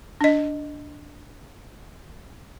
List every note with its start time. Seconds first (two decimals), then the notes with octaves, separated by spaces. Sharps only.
0.21 D4 D#5